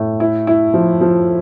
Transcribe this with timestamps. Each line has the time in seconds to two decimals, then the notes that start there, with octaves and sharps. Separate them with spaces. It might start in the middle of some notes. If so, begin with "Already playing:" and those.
Already playing: A2
0.20 E4
0.47 E4
0.74 F3
1.01 F3